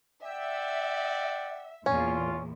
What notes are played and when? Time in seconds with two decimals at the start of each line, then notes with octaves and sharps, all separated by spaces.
0.23 D5 E5 F#5 G5
1.86 E2 A#2 C#4 F4